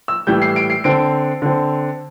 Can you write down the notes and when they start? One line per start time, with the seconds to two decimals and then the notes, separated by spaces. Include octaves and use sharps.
0.08 E6
0.27 A2 E3 G3 G6
0.42 C7
0.56 D7
0.70 C7
0.84 D3 C4 D7
1.42 D3 C4